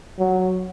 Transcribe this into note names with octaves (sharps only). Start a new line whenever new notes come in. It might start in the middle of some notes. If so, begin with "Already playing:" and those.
F#3